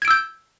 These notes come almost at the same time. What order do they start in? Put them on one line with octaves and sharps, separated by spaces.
G#6 D7 E6 G6